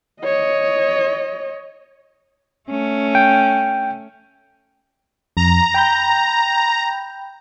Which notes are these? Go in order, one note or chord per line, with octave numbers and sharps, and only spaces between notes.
C#5 D#5
A3 C#4
G5
F2 A#5
G5 B5 G6